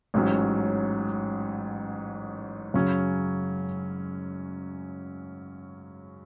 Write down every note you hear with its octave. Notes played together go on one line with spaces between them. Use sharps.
A1 G#2 F#3 C#4
F#2 C#3 F#3 C#4